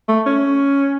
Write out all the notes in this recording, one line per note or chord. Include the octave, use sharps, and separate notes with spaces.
A3
C#4